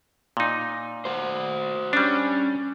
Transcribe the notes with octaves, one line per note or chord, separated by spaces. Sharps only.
A#2 D#4
F#4 C5
G3 C#4 D4